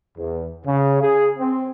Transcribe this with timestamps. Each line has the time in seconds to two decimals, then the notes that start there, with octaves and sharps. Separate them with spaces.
0.17 E2
0.64 C#3
1.01 G#4
1.39 C4